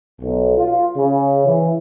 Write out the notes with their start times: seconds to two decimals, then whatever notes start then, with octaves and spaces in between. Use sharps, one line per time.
0.21 B1
0.58 F4
0.97 C#3
1.46 E3